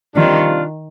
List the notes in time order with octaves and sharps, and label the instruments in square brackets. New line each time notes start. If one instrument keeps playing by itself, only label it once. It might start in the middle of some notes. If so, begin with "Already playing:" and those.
[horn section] C3 G3 D4 F4 [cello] D#3